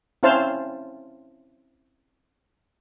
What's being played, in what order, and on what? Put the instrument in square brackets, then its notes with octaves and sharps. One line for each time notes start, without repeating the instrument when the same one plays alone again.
[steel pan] C4 C#4 E4 C5 F5 A5